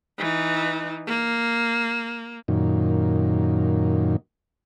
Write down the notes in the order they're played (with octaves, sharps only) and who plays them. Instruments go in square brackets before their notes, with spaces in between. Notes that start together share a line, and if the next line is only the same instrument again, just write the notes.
[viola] E3 D#4
A#3
[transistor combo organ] F#2 A#2 D#3